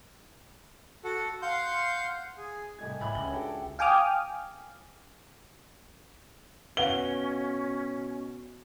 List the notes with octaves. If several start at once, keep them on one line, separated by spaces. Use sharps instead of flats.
F#4 A4 F#5
F5 F#5 C6 G6
G#4
C2 A3 G4 D#5 G#5 G#6
A2 E5 B5
C#2 C#4 G7
D4 F#4 A4 G5
F5 G5 G#5 D6 D#6 F6
B2 C#4 B4 F5 F#5 G7